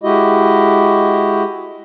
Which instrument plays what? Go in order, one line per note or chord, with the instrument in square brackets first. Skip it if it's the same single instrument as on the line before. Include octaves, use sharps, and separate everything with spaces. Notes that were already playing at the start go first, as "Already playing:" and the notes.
[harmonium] G#3 E4 F#4 G4 D#5